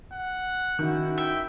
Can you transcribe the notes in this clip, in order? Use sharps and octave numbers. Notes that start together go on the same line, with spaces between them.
F#5
D#3 C#4 E4 F#4
E5 G5